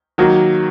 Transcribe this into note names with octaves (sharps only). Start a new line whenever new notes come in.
D#3 F#3 A#3 F#4